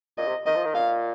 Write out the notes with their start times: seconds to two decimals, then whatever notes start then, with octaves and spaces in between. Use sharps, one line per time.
0.18 A#2 D#5
0.28 C3
0.46 D#3 D#5
0.56 F3
0.65 D#3
0.75 A#2 F5